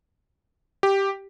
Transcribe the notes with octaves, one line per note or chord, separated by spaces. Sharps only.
G4